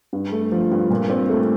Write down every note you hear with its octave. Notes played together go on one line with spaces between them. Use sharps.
G2
A3
F3
G2
A#2
C4
A3